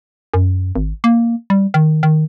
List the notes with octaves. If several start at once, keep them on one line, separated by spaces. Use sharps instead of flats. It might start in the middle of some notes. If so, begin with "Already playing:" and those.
F#2
G#1
A#3
G3
D#3
D#3